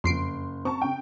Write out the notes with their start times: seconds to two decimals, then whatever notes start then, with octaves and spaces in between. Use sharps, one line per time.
0.04 F#1 F2 C6 C7 D7
0.65 C4 A5 A#5 C#6
0.82 C#3 G5